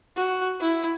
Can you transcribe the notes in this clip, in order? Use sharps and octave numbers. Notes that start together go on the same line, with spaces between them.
F#4
E4